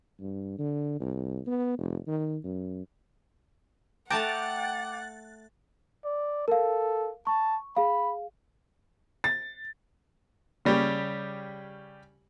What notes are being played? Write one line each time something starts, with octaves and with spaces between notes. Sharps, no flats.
G2
D3
C2
B3
F1
D#3
F#2
A3 F#5 G5 A5 A#5 D6 F#6 A6
D5
A4 A#4 F5
A5 C#6
G#4 F5 B5
A6
C#3 G3 C#4 G4